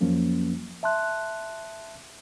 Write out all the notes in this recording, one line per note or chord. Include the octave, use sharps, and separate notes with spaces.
F2 F3 F#3 A#3 C#4
E5 A5 C6 F#6